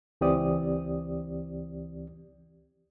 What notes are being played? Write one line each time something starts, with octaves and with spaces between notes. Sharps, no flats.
C#2 E3 C4 G4 D5 D#6